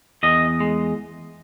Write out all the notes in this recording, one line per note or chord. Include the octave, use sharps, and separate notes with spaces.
E2 D#5
G#3